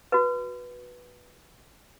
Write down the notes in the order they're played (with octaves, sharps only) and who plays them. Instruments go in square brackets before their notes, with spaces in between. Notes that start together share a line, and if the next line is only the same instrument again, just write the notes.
[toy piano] F#4 B4